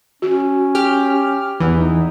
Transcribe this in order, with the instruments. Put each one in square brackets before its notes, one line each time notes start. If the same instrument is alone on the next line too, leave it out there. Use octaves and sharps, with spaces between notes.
[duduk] C#4 [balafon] F#4
[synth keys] G4 F6
[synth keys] E2 E3 [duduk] B3
[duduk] D#4